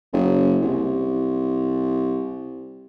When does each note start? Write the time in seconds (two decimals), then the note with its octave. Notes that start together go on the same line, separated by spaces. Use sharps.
0.13 F#1
0.62 C2